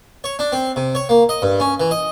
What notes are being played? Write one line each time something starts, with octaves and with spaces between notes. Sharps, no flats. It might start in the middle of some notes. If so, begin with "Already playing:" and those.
C#5
D4
C4
C3
C#5
A#3
D#5
G2
C#4
E3
D#5